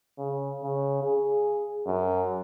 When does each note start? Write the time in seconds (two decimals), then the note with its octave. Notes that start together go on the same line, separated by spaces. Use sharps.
0.18 C#3
0.63 C#3
1.04 G#4
1.86 F#2